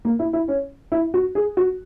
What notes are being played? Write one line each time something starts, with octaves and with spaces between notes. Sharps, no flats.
A#3
E4
E4
C#4
E4
F#4
G#4
F#4